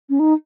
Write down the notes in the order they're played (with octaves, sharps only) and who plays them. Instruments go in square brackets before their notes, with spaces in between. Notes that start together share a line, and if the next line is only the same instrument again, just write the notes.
[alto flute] C#4
D#4